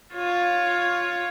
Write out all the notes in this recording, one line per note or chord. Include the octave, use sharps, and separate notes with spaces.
F4 C#5